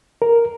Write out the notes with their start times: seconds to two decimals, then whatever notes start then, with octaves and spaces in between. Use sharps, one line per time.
0.22 A#4